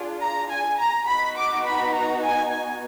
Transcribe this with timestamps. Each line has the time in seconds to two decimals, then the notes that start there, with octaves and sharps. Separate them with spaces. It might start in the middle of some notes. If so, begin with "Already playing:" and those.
Already playing: D4 F4 G#4
0.21 A#5
0.51 G#5
0.79 A#5
1.08 B3 D#4 F#4 B5
1.37 D6
1.66 B5
1.95 A#5
2.23 G#5
2.52 G#5